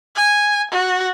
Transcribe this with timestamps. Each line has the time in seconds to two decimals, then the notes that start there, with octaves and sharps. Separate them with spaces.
0.15 G#5
0.71 F#4